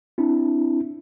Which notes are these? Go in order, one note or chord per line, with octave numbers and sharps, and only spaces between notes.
C4 D4 E4